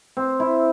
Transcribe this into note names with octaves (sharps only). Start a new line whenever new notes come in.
C4
E4